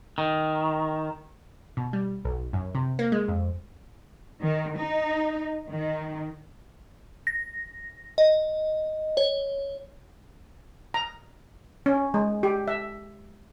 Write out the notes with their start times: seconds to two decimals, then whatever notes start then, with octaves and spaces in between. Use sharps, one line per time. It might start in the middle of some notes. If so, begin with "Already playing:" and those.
0.18 D#3
1.77 B2
1.93 G3
2.25 B1
2.53 F#2
2.75 C3
2.99 A#3
3.12 G#3
3.28 F2
4.41 D#3
4.78 D#4
5.70 D#3
7.27 A#6
8.18 D#5
9.17 C#5
10.94 A#5
11.86 C#4
12.14 G#3
12.43 G4
12.68 E5